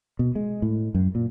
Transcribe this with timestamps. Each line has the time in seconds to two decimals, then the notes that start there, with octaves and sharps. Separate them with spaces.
0.19 B2
0.35 G#3
0.62 A2
0.95 F#2
1.15 A#2